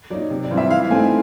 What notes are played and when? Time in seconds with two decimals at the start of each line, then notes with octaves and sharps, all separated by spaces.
0.10 F#3 A#3 D#4 D5
0.30 C3
0.44 D5
0.50 E3 G3 C4 F4
0.57 E5
0.70 E3 F5
0.90 A3 C4 D#4 G#5